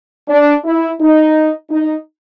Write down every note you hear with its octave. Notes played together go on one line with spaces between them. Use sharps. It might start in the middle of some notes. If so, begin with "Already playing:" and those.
D4
E4
D#4
D#4